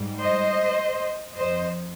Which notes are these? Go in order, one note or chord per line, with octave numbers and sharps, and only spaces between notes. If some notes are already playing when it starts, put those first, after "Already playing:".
Already playing: G#2 G3
C5 D#5
F2 C5 D#5